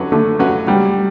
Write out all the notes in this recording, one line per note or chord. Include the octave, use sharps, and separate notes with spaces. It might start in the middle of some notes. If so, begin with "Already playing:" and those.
Already playing: D3 F#3 C#4 F#4 B4
D3 A3
F#3 C#4 F#4 B4
F#3 G3